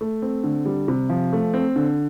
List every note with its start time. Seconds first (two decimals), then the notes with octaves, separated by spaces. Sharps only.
0.01 A3
0.22 C4
0.44 D3
0.66 G3
0.88 C3
1.10 F3
1.33 A3
1.54 C4
1.76 D3